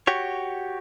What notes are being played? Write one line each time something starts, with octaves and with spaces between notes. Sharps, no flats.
F#4 G4 C#5